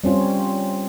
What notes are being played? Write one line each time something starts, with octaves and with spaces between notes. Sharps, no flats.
G3 C4 C#4 F4